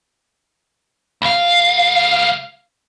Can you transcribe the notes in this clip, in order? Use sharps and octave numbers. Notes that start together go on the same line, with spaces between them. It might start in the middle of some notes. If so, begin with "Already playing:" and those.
C#2 F5